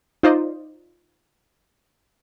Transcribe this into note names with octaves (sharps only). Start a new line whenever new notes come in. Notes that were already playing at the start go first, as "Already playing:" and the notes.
D#4 F4 C5 D5 D#5